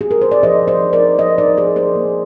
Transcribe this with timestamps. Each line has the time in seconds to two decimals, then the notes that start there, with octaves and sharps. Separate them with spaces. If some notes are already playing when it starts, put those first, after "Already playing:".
0.01 G#4
0.11 A#4
0.22 C5
0.32 D5
0.43 F3 C5 D#5
0.62 F3
0.68 C5 D#5
0.80 D#4
0.93 A#4 D5
1.00 D#4
1.18 F3 C5 D#5
1.38 D#4 A#4 D5
1.57 F3 G#4 C5
1.76 A#3 G#4 C5
1.95 A#3